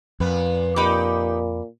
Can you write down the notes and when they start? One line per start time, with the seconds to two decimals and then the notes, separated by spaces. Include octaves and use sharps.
0.20 F2 A#2 B3 B4
0.76 A#2 D#4 G4 B4 B5 D6